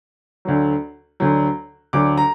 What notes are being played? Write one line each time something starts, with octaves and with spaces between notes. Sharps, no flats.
D2 D3 F#3
D2 D3 F#3
D2 D3 F#3 D6
A#5